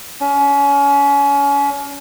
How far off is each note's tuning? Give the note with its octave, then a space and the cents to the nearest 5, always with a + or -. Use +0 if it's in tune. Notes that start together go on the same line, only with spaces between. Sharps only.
C#4 +30